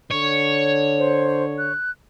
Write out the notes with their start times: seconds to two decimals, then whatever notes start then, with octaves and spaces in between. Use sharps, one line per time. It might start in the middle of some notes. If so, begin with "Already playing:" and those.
0.11 D3 C#5
0.98 C5
1.58 F#6